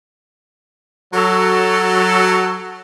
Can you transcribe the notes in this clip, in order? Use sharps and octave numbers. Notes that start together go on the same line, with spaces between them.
F#3 A4